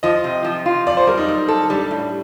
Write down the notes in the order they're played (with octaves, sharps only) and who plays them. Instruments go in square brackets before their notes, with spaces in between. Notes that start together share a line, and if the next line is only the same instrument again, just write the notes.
[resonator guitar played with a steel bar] F3 [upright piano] D#5
[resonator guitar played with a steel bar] C3
F3
F4
[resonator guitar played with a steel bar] F2 [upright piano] D5
[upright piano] C5
[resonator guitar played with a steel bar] G3 [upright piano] A#4
[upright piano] D#4
[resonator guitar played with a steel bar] A#2
A4
[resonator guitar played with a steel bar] G3 [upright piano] D4
[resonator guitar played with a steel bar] A2